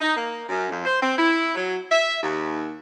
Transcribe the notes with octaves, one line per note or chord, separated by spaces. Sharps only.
D#4
A#3
F#2
F2
C5
C4
E4
F#3
E5
D#2